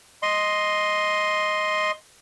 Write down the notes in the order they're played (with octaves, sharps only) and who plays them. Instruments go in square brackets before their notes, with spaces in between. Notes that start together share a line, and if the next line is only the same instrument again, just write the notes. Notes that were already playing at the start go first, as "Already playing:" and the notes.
[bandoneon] D#5 C6